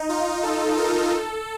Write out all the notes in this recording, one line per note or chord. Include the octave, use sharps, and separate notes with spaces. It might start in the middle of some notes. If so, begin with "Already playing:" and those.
Already playing: D#4
F4
A4
A#4
A4